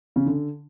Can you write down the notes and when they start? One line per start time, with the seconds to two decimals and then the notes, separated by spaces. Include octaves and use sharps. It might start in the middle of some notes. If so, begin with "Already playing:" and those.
0.16 C#3
0.26 D3